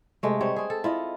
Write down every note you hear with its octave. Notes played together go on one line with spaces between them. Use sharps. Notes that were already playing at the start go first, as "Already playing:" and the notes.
C3 G#3 A3
G3 C4 C#5
C4 G#4
A4
E4 F4 D#5